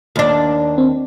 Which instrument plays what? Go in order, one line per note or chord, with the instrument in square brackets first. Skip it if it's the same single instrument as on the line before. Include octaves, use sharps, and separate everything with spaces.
[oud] D#2 D4
[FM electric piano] C4